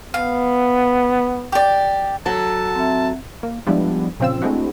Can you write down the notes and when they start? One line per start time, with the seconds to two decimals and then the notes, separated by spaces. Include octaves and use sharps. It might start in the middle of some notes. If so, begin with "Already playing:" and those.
0.14 B3 F5
1.52 G4 D5
2.26 F#3 A4 A5
2.75 C4 E5
3.43 A#3
3.67 F3 G3 G#3 B3 D4 E4
4.20 A#2 C#3 F3 C4 F4 E6
4.42 G#3 A3 C4 D4 E4 F#4